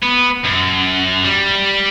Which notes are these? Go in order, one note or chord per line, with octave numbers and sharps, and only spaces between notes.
B3
F#2
G3